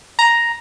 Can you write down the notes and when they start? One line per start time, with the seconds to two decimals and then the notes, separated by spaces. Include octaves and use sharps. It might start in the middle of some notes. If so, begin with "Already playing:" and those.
0.19 A#5